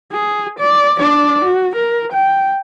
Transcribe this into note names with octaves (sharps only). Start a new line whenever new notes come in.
G#4
D5
D4 D5
F#4
A#4
G5